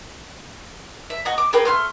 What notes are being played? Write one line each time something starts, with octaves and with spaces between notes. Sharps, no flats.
E5
F#4 D#5 A#5
D6
G#4 A#4 B4 G5
A3 F#4 C6 F6